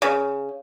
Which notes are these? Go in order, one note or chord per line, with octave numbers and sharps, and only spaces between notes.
C#3